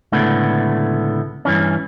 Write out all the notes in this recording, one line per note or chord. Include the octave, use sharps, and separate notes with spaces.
C#2 A2 D3 A3 B3
G2 E3 C#4